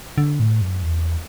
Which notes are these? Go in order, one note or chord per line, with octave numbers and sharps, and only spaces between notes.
D3
A2
F#2
E2